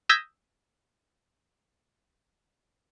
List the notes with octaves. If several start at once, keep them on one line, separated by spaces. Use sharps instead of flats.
D#6 E6 G6 G#6 A#6 B6